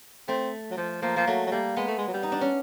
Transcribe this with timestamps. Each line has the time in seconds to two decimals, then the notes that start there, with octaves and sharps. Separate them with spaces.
0.28 A3 C4
0.71 F#3
0.77 F3
1.02 F3 A#3
1.16 F3 A#3
1.27 F#3 A3
1.46 F#3
1.52 G3 A#3
1.77 G#3 B3
1.87 A3
1.98 G#3
2.08 F#3
2.13 G3
2.23 D#4
2.32 D4
2.41 C#4